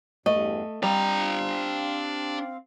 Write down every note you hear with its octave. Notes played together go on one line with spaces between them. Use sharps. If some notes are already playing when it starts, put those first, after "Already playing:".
E2 G2 A3 D#5
G3 C4 D4 F5 A#5